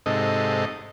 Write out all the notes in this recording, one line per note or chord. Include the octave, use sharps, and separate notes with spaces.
G#2 C3 D#4 A4 D#5